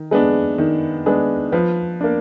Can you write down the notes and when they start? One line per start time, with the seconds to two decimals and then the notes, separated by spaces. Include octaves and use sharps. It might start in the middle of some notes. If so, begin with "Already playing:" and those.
Already playing: D#3
0.11 G#3 B3 D4
0.58 D#3
1.06 G#3 B3 D4
1.52 F3 B4
2.01 A#3 D4